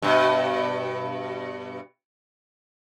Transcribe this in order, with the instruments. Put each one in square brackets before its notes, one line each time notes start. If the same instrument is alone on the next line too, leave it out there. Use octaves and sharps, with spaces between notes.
[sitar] G2 B2